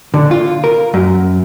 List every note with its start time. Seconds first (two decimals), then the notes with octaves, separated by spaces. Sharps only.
0.14 D3
0.31 F4
0.64 A#4
0.94 F#2